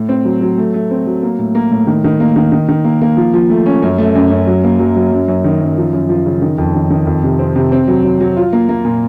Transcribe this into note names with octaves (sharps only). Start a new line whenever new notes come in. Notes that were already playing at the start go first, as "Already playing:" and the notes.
Already playing: A2
C4
F#3
F#3
A3
A3
C4
F#3
A#3
A2
A#3
A2
D#3
D#3
A#3
D#3
D#3
D#3
A#3
A#3
F3
F3
A3
C#4
F#2
A3
F#2
F#2
F#3
A#3
F#3
F#3
F#2
F#2
D#3
F#2
F3
F#2
F3
C#3
D#3
F2
D#3
D#3
F2
C3
C4
C3
C4
F#3
F#3
F#3
F4
A#3
A#3
A#2